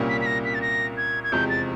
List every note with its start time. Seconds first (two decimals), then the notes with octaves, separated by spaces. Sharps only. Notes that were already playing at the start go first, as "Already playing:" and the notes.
Already playing: C2 A#2 G3 A#3 C#4
0.09 B6
0.21 B6
0.26 A#6
0.45 B6
0.55 A6
0.62 A#6
0.97 G#6
1.24 G#6
1.32 F1 E2 C3 F3 G#3 G6
1.49 A6